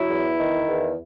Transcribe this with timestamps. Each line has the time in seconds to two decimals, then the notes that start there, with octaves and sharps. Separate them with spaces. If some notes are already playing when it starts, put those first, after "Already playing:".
Already playing: F#3 E4
0.09 E2
0.39 D#3
0.68 E2